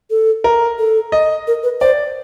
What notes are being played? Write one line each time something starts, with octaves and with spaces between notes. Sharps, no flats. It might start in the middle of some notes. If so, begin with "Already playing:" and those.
A4
A#4
A4
D#5
A#4
B4
C5 D5